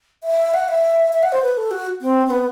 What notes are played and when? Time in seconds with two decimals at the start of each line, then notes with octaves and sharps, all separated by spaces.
0.24 E5
0.54 F#5
0.68 E5
1.13 E5
1.23 F#5
1.32 C5
1.42 B4
1.57 A4
1.71 F#4
2.01 C4
2.26 C4
2.30 B3